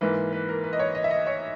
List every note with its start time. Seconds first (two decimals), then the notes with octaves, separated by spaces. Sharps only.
0.01 G#2 E3 A#3 B4
0.33 B4
0.49 A#4
0.64 B4
0.73 D#5
0.79 C#5
0.95 D#5
1.04 E5
1.11 D#5
1.27 C#5